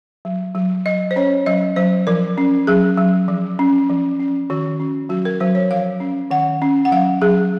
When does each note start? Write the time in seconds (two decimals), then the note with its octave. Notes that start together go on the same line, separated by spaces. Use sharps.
0.25 F#3
0.55 F#3
0.86 F#3 D#5
1.11 C5
1.16 C#4 C#5
1.46 F#3 D#5
1.76 F#3 C5
2.07 F3 A#4
2.38 C#4
2.67 F#3 G#4
2.97 F#3
3.28 F3
3.59 C#4
3.89 F3
4.19 C#4
4.50 D#3 F#4
4.80 C#4
5.09 F#3 F#4
5.25 A#4
5.40 F#3 C5
5.55 C#5
5.71 F3 F5
6.00 C#4
6.31 D#3 F#5
6.62 C#4
6.85 F#5
6.92 F#3 F5
7.21 F#3 G#4